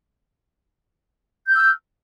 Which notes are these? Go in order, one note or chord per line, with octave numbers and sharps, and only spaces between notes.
E6 F6 G6